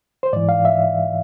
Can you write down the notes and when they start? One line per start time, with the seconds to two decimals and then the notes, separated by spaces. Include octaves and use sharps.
0.23 C5
0.33 G#2 E3 D5
0.49 F5
0.65 E5